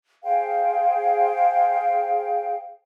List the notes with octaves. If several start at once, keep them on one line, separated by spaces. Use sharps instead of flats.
G#4 C5 F5 G5